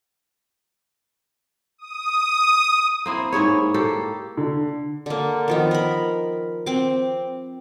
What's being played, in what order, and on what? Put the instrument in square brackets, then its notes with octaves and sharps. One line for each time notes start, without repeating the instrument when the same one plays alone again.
[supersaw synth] D#6
[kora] A#3 C4 E4
G#2 E4 G#4 C#5
A#3 G4 A4
[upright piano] D3
[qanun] D3 A#3
D#3 F3 B3
A#4 B5
C4 D6